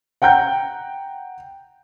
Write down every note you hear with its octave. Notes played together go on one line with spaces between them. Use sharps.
F#5 G5 A#5 G6